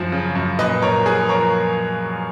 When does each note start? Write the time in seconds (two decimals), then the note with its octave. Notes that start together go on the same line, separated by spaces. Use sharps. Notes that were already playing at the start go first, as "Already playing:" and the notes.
Already playing: F#2 F3
0.12 C#3
0.35 F#2
0.59 A#2 B4 D#5
0.82 A#2 A#4 C#5
1.06 F3 G#4 B4
1.29 F3 A#4 C#5